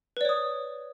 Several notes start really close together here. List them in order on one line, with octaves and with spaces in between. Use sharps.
B4 D5 C#5 D#6